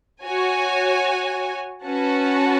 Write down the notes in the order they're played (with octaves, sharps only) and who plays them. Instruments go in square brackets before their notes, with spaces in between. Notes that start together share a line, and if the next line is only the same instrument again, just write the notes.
[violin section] F#4 C#5 G#5
C#4 F#4 B4 F#5 A5